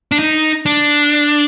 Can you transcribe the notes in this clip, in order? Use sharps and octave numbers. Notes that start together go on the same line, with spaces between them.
D4
D#4
D4